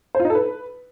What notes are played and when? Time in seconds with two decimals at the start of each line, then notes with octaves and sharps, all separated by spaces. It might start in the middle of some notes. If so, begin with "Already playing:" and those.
0.15 C5
0.20 F4
0.25 D#4
0.30 A4
0.35 B4